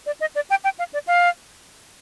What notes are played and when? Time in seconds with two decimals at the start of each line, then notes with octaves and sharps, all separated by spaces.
0.06 D5
0.21 D#5
0.35 D5
0.50 G5
0.64 G5
0.79 F5
0.93 D5
1.07 F5